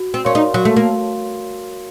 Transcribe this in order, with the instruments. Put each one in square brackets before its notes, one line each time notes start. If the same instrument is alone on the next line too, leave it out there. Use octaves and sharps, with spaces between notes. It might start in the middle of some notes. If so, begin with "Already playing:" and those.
Already playing: [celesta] F#4
[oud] C4
[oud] C#4 [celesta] A#4 C#5 F5 C6
[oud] D#4
[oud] F#3 [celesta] F#4
[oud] A3
A#3